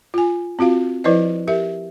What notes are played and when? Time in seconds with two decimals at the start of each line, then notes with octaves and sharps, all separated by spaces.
0.14 F4 G#5
0.59 C4 F4 F#4 F5
1.04 F3 E4 B4 C5 D5 D#5
1.48 G4 A#4 E5